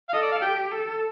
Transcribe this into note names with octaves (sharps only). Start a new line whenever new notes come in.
F5
A4 D#5
D5
F5
G4 G5
A4